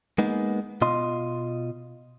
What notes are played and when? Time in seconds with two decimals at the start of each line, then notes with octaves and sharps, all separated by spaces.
0.18 G#3 A#3 B3 D#4
0.82 B2 F4 D#5 C6